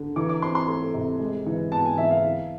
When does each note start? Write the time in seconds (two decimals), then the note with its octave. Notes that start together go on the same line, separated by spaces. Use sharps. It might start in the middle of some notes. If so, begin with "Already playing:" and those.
Already playing: D3
0.16 E3 D6
0.29 D6
0.42 C4 C6
0.55 C6
0.68 A3
0.94 C3
1.20 G#3
1.46 E3
1.72 B3 A5
1.85 G#5
1.98 E3 E5
2.11 F5
2.24 E3